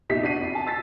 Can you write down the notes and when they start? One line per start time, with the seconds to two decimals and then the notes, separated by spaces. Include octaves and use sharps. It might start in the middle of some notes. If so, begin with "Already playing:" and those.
0.09 E2 A#2 D#4 G4 E5 B6
0.23 D4 F#4 C7 D#7
0.40 F2
0.55 G#5 A5
0.67 E6 A6 B6